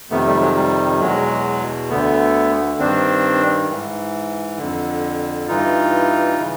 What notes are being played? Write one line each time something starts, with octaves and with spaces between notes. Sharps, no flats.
F2 C3 D#3 A3 B3
G3 A3
F#3 G#3
G3
E2 B2 F#3 G#3
D2 D3 A3 B3
G2 D#3 C4 D4
G#2 E3
F2 D3
G2 E3 D#4 F4
C#3 E3